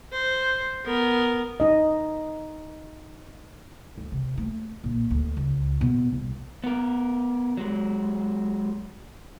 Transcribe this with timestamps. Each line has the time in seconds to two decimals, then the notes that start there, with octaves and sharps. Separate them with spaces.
0.13 C5
0.86 B3 A#4
1.60 D#4 D#5
3.98 D2
4.12 C3
4.38 A3
4.84 A#1
5.10 D2
5.37 C#2
5.81 B2
6.13 C2
6.64 B3 A#4
7.57 F#3 G#3